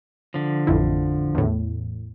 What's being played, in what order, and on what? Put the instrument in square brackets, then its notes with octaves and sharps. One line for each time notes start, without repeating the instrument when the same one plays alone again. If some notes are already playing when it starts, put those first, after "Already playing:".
[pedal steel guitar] D3 F3
[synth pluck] A1 F2 E4
E2 A2